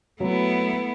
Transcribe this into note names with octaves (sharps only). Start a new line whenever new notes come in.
F#3 A3 B3 E4